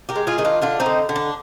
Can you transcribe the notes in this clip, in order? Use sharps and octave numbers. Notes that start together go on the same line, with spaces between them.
G4 A#4
G#3
F4 G#4
D#3 D#4
D4 F4
D3 D4 F4
C4 D#4
D3
D3
D4